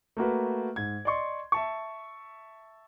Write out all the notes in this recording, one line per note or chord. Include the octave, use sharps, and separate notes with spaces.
A3 A#3 F#4 B4
G#2 G#6
D5 D#5 C6 C#6
E5 A5 C#6